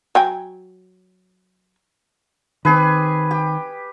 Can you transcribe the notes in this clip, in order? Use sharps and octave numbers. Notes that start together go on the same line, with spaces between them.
F#3 G5 G#5
D#3 C4 G4 G#4 B4
G4